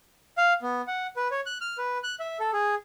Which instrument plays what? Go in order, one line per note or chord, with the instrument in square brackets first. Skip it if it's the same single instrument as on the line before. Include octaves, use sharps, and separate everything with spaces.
[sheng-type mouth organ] F5
B3
F#5
B4
C#5
F#6
F6
B4
F#6
E5
A4
G#4